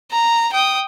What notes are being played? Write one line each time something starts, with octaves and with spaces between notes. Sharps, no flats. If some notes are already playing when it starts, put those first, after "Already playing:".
A#5
G5 D#6